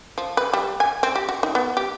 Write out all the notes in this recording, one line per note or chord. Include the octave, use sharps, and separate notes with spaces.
F3
B4
G3
G#5
C4
G4
F#4
D#4
B3
G4